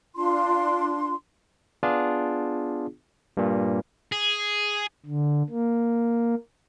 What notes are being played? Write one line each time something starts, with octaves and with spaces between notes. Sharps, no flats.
D4 F4 C6
B3 D4 F4 G#4
G2 A#2
G#4
D3
A#3